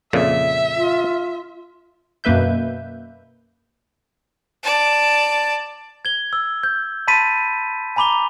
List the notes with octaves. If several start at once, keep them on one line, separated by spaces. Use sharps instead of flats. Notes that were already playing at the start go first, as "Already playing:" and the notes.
F2 A#2 C#3 E5
F4
F#2 B2 A#3 B4 E5 G6
D5 A5
G#6 G7
E6
G6
A5 B5 C6 A6 B6 D#7
G#5 A#5 B5 D6 F7 G7